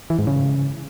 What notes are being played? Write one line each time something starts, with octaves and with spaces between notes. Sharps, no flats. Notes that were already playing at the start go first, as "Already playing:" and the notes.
E3
G#2
C#3